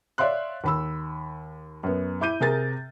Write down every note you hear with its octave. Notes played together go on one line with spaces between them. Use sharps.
C#5 D5 E5 F5 C6 F#6
D#2 B5 E6
F#2 B3
E4 D6 G6 D#7
C3 G#4 A#4 A6